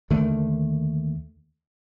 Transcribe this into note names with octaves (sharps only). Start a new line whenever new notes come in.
D#2 D3 D#3 A3